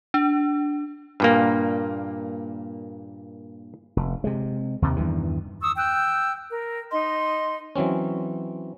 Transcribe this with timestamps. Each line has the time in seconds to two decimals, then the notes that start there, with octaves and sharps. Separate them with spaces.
0.14 D4
1.20 G2 A#2 A#3
3.97 F1
4.24 C3 G#3
4.82 D#2 C3 D#3
4.96 E2 G2 D#3 E3
5.62 C#6 D#6 E6
5.77 G5 E6 F#6 G6
6.50 A#4
6.91 D#4 D#5 C6
7.76 E3 F#3 C4 C#4